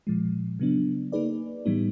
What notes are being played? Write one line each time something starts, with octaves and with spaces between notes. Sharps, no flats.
A#2 F3 G#3
C#3 F#3 B3 D4
A#3 D#4 G#4 B4 D5
A2 E3 G3 B3 D#4